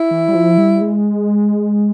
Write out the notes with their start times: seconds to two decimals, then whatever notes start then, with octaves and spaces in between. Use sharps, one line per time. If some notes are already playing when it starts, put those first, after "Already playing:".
Already playing: E4
0.11 E3
0.28 G3
0.35 F3
0.58 G3
0.81 G#3